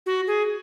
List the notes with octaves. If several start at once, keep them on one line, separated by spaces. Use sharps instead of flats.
F#4
G#4